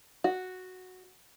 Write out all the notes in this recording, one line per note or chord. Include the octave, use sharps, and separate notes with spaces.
F#4